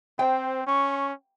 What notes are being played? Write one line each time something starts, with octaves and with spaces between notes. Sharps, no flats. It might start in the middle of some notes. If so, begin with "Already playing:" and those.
C4 C5 G5
C#4 C#6